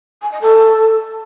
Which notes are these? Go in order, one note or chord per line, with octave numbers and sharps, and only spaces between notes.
G#5
D#5
A4